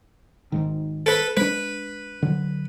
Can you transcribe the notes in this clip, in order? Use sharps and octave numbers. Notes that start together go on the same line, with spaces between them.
G#1 G#2 D#3
A4 B4
G#3 A3 D4 B4
D3 F#3